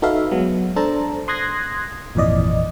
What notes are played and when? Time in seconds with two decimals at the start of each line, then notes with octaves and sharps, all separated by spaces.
0.02 D#4 F#4 A4 B4 E5 F5
0.31 F#3 G#3 B3
0.76 D4 A4 C5 A5 A#5
1.28 C6 D#6 F#6 G#6 A#6 C7
2.15 G#1 F2 A#2 E3 D5 D#5